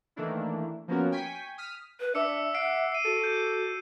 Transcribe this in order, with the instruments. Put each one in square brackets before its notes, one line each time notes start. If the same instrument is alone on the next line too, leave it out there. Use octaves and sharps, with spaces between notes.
[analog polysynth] D#3 E3 A3 A#3 D4 E4
F3 A#3 B3 C#4 F#4 A#4
G5 G#5 C#6 B6
D#6 F6 B6
[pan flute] B4
[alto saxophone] D4 [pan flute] E5 [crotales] D6 E6 C#7
[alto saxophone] F#5 [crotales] C7 D7
[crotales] C7 D#7
[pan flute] F#4 [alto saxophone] A4
[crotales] G6